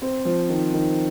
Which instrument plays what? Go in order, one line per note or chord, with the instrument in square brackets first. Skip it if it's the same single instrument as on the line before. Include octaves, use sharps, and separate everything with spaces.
[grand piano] C4
F3
D#3
D#3